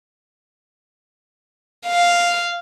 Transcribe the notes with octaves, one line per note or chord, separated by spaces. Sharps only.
F5